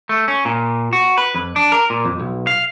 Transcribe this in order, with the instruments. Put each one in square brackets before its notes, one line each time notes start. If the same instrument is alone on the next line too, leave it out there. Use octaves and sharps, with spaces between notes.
[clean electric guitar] A3
C#4
A#2
F#4
B4
F2
D4
A#4
A#2
F2
B1
F5